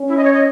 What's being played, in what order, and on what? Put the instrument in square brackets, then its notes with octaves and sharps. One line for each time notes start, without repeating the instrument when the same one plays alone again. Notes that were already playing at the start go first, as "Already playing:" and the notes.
Already playing: [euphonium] C#4
[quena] E4
D#5
C#5
D#5